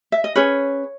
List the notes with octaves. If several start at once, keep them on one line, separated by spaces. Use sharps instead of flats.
E5
D#5
C#4 G#4 B4 C#5